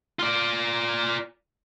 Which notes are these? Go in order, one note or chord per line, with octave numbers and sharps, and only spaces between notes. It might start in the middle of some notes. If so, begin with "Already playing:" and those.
F4 D5